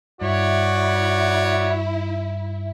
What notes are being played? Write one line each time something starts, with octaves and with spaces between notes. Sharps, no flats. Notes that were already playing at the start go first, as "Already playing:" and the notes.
G2 E4 F#4 C#5 D5